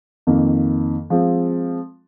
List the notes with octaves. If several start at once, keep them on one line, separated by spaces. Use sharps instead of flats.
F2 D#3 A#3
F3 G#3 C4